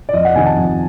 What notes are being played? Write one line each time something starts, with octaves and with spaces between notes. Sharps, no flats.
D5
F2 D#5
F#5
C3 D#3 G#5
A5
F2